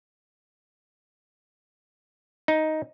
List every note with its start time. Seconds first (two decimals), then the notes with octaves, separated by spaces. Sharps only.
2.48 D#4